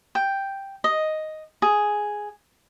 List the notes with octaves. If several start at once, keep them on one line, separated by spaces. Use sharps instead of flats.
G5
D#5
G#4